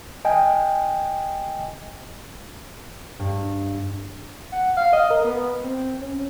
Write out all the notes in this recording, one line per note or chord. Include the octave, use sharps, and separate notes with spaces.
D#5 G5 G#5
G2
F#5
F5
D#5
A#4
B3
C4
C#4